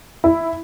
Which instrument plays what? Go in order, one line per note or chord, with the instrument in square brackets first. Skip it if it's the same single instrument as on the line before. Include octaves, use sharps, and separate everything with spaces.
[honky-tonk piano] E4